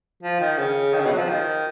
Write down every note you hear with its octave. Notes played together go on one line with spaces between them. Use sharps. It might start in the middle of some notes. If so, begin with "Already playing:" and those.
F3
D#3
C#3
D#3
C#3
B2
F#3
F3
D#3